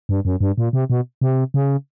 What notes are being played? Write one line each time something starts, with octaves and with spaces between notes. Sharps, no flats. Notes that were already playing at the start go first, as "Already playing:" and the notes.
G2
F#2
G2
A#2
C3
B2
C3
C#3